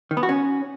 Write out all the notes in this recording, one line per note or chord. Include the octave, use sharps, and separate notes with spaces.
D#3
B3
F#4
C#4